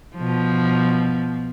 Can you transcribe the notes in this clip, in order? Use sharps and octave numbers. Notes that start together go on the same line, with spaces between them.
B2 F3